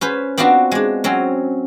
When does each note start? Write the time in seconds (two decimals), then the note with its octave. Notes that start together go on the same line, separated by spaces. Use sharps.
0.01 C#4 B4 C5
0.38 B3 C4 D4 F4 F#4
0.71 G#3 D4
1.04 F#3 C4 C#4